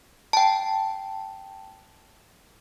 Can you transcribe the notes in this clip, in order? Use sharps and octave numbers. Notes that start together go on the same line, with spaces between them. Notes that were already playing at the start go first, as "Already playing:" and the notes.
G5 A5